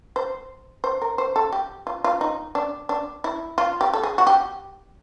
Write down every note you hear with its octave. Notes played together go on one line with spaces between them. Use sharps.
C5
C5
A#4
C5
A4
G4
F4
F4
D#4
D4
D4
E4
F4
G4
A4
G#4
F#4
G4